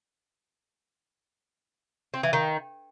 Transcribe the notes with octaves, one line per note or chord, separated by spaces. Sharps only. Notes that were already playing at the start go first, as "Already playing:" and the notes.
C4
E3
D#3